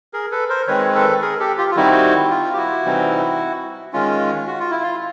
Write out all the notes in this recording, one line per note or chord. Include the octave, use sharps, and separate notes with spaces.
G#4 A#4
A4 B4
A#4 C5
D#3 G#3 C4 B4 C#5
A4 B4
G#4 A#4
G4 A4
F4 G4
F4
D#3 G3 C4 D#4 E4 F#4
F4
G4
E4 F#4
C3 E3 G3 C4 D#4
D#3 G#3 C#4 F4
F#4
F4
E4
F4